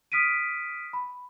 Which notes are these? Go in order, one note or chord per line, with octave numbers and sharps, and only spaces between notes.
D#6 F6 B6 D7 D#7
B5